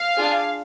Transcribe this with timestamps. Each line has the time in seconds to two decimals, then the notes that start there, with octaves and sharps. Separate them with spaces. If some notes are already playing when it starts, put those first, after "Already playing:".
Already playing: F5
0.16 D4 F4 G#4